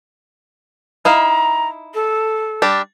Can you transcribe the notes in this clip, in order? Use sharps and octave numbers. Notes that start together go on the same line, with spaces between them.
D#4 E4 F5 A#5
A4
G3 D4 G4